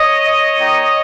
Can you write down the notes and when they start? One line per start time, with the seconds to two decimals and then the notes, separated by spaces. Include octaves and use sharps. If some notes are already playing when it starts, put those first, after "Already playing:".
Already playing: C#5 D#5
0.58 A#3 D#4 G4